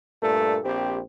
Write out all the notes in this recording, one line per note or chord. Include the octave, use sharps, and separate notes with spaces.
G2 A#2 A3 A4
A#1 C4 G4